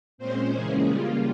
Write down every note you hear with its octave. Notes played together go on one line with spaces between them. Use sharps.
A#2 G#3 C4 C#4 C5
C#3 E3 G#3 A#3 C#4 G#4
C#3 G3 A#3 F4